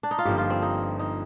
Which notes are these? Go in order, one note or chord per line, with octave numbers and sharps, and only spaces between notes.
D4
D#4
F4
G1 G2 F3 A#3 G4
F4
C4
D#4
D#4